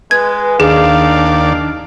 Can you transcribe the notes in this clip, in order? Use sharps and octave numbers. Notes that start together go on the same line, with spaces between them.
G#3 B4 G#6
D#2 D4 G#4 D5 F5